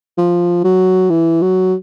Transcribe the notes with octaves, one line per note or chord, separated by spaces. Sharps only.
F3
F#3
E3
F#3